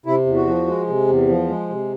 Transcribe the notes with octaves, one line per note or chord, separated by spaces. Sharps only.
C3 E4
E2
F#4
F3
G#3
C3
E2
F3
G#3
C3